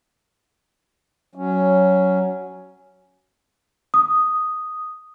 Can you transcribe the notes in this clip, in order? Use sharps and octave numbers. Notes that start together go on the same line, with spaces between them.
F#3 C#4
D#6